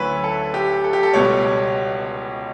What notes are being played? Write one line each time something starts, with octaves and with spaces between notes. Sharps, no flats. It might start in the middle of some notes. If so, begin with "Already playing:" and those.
Already playing: D2 D3 F#3 C#4 E4 B4 C#5
A4
G4
A4
G4
A4
C#2 B2 G3 C#5